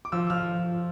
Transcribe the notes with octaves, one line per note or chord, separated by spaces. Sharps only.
D6
F3 E6
F3 F6